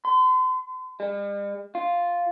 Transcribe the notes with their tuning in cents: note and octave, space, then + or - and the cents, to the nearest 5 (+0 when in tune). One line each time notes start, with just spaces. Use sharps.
C6 -40
G3 +45
F4 +0